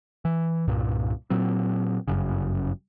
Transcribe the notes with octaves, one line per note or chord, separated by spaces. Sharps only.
E3
C2 G2 A#2
A#2 F#3 C4
G1 F#2 C#3